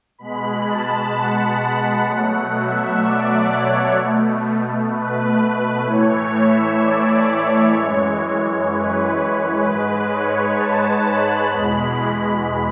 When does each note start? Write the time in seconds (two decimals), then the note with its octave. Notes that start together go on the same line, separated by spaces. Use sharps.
0.18 B2 G#3 B5
0.66 A5
1.13 F#5
2.07 B2 F#3 A3
2.54 E5
3.01 D5
3.48 C#5
3.95 B2 A3
4.89 B4
5.37 B4
5.83 A2 E3 A3 C#5
6.31 E5
6.77 D5
7.25 C#5
7.72 F#2 E3 G#3
8.66 B4
9.60 G#2 G#3 B4
10.07 C#5
10.54 A5
11.01 B5
11.48 E2 B2 G#3